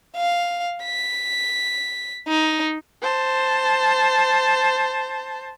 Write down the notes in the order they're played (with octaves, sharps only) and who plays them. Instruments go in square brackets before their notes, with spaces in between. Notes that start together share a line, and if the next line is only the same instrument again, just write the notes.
[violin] F5
B6
D#4
[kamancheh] C5 A5